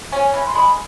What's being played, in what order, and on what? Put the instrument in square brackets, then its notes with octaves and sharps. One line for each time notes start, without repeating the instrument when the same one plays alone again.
[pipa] C#4 [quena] G#5
[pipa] E3
[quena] C6
[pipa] G#3 [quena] B5